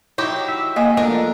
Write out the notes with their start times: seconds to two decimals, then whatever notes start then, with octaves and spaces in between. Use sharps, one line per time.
0.18 F#3 D#4 E4 G4
0.48 E5
0.76 A#3 D#5 F5 G#5
0.97 F3 A3 B3 D4 A#4